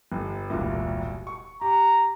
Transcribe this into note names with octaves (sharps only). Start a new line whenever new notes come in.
G1
E1 C2 A#2
C#6
G4 A#5